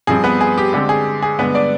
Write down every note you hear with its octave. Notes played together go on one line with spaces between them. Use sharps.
G2 F3 C4 G#4
B3 B4
G#4
G4
D3 G#3 C4 G4
G#4
G#4
G2 D3 G#3 B3 D4 B4
D4 D5